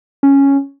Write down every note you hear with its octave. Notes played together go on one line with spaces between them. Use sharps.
C#4